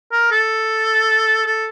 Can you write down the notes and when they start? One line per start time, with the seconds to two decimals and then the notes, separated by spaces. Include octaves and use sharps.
0.12 A#4
0.31 A4
1.46 A4